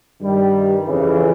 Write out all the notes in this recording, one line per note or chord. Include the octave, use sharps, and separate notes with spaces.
G2 D#3 G3
F2 C#3 E3